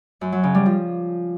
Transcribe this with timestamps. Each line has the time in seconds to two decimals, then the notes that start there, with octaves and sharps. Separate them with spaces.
0.21 F#2
0.32 F#3
0.43 C#3
0.55 G3
0.66 F3